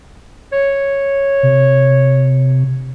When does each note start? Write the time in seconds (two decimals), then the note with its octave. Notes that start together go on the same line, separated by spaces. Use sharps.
0.52 C#5
1.43 C3